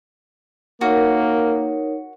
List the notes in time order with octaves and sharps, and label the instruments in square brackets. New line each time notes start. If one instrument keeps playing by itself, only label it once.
[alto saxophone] A#3 [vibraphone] D#4 A#4 C#5 [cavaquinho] F#4